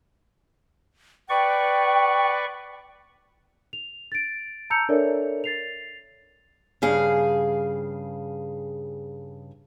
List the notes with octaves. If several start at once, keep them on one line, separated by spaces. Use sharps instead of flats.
B4 D5 G5 C#6
F7
A6 D7
A5 A#5 E6 G6 C#7 F7
D4 A4 A#4 C#5 D5 E5
A6 C7 F7
G2 C#3 G#4 F5